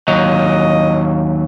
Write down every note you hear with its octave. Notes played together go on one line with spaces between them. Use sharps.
D#2 F#3 D#5